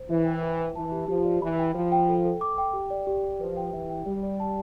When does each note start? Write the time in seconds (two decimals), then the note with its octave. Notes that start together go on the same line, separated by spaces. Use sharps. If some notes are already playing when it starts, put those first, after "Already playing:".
Already playing: C5
0.10 E3 E5
0.26 G5
0.43 B4
0.60 B4
0.76 E3 A5
0.92 G4
1.08 F3 G4
1.25 D5
1.42 E3 B5
1.59 G5
1.74 F3 C5
1.92 G5
2.09 A4
2.25 A4
2.41 D6
2.58 G5
2.73 G4
2.90 D5
3.07 G4
3.24 G4
3.40 F3 B4
3.57 G5
3.73 E3 E5
3.90 G5
4.06 G3 D5
4.23 D5
4.40 A5